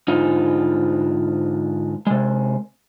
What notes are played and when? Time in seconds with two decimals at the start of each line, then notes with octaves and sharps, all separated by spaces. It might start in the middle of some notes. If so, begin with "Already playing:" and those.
0.08 G#2 D3 D#4 F4
2.07 C3 G#3